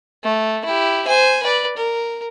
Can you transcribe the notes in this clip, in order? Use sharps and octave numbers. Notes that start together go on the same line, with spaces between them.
A3
E4 G4
C5 G#5
B4 D5
A#4